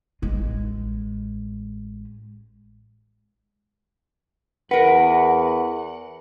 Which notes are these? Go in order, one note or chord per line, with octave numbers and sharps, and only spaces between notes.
A1 G#3
E2 A#4 B4 F#5